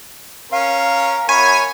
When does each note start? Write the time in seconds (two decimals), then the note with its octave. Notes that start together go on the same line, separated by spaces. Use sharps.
0.52 C#4 A#4 F5
1.29 F#2 C#5 G#5 B5